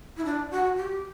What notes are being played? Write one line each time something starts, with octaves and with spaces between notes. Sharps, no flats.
E4
D4
F#4
G4